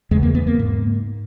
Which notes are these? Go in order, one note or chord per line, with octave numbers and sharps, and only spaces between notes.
E2 C#3 G#3
A#3
B3
A#3
G#2